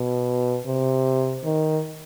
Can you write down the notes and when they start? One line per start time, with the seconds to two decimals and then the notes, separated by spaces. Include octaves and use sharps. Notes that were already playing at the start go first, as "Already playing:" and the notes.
Already playing: B2
0.66 C3
1.44 D#3